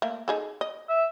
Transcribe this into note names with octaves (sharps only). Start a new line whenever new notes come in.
A3 A#3
D#4 G#4 A4
D#5
E5